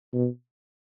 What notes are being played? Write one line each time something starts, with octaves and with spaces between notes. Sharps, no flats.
B2